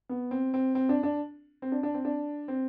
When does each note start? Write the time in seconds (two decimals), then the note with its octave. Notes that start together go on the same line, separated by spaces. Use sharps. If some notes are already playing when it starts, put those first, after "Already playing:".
0.09 B3
0.31 C4
0.54 C4
0.75 C4
0.89 D4
1.03 D4
1.62 C4
1.72 D4
1.83 D4
1.94 C4
2.05 D4
2.48 C4